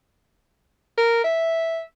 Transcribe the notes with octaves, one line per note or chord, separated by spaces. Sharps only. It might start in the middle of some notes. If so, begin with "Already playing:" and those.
A#4
E5